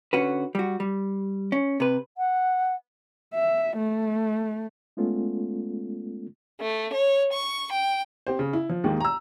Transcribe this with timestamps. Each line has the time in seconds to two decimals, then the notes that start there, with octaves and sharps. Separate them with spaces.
0.13 D3 C#4 F#4 B4
0.55 G3 F#4
0.80 G3
1.52 C#4
1.80 C3 B4
2.17 F#5
3.34 E5
3.77 A3
4.97 G#3 A3 B3 C#4 F4 A4
6.61 A3
6.94 C#5
7.32 C#6
7.73 G5
8.27 C4 G4 C5
8.39 C#3
8.53 E4
8.69 F3
8.84 D#2 D#3 G#3 A#3
9.01 A#5 E6